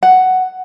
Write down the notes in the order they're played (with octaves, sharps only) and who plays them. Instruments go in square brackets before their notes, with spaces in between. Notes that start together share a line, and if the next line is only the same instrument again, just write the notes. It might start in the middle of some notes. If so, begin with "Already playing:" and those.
[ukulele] F#5